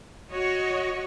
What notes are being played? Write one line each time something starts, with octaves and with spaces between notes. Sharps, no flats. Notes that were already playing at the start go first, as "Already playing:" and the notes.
F#4 C#5 D#5